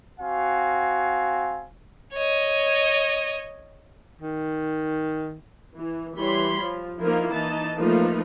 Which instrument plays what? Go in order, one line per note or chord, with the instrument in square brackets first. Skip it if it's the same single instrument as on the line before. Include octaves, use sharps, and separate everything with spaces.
[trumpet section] C4 F#4 F5 G#5
[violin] C#5 D#5
[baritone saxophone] D#3
[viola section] E3
E3 G3 C#5 B5 C6
F3
F3 A#3 D#4 E4 A#4
E3 D#4 A5
F3 A3 A#3 D#4 B4